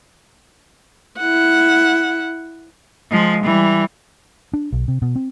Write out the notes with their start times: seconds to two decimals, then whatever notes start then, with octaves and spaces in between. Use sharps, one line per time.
1.18 E4 F#5
3.10 F3 G#3
3.43 E3 G3
4.53 D4
4.72 B1
4.88 C3
5.02 B2
5.16 C4